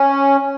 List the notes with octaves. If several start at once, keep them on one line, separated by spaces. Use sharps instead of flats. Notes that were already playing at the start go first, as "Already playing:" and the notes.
Already playing: C#4